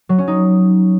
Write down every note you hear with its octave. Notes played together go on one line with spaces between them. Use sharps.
F#3
C#4
D#4